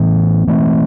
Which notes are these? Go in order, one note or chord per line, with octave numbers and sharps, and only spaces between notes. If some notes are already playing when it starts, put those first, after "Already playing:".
Already playing: A2 E3 B3
E3 A3 C4